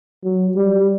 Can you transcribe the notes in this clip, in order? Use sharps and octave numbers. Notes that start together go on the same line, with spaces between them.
F#3
G3